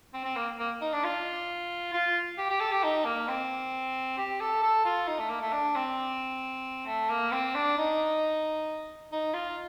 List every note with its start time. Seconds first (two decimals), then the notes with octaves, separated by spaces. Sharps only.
0.13 C4
0.24 C4
0.36 A#3
0.59 A#3
0.81 D#4
0.92 D4
1.04 F4
1.93 F4
2.38 G4
2.49 G4
2.60 A4
2.72 G4
2.83 D#4
3.05 A#3
3.28 C4
4.17 G4
4.40 A4
4.62 A4
4.85 F4
5.07 D#4
5.19 A3
5.30 A#3
5.41 A3
5.52 D4
5.75 C4
6.86 A3
7.10 A#3
7.32 C4
7.54 D4
7.77 D#4
9.12 D#4
9.34 F4